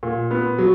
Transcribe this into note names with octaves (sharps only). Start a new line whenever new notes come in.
A#2
B3
F#3